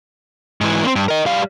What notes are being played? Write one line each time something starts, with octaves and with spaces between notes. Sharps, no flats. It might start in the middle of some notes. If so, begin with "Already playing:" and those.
G#2 E3
A#3 C4
G2
A#4 D#5
G3 F5